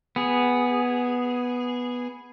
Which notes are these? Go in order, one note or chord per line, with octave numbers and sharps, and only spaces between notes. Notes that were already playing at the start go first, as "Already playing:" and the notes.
B3 G#4